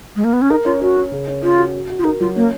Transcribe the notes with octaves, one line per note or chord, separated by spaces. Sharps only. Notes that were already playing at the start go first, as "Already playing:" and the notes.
G#3
A#3
B3
C#4
D#4 A#4
C#4 F4
C#4 F#4
C#4
C#3
C#4
C#4 F4
F#4
F#4
F#4
F4
D#4 A#4
F#3 F4
A#3 C#4